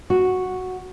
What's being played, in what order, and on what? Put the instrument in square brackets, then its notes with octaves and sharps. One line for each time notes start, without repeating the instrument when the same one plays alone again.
[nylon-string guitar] F#4